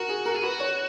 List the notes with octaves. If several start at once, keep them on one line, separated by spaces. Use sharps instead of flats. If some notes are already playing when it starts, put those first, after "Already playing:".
Already playing: F#4 A#4
G#4
A#4
G#4
F#4 B4
C#5